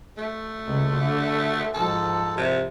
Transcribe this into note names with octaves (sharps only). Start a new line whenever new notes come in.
A3
C#2
D3
G#2 F3 A4
C3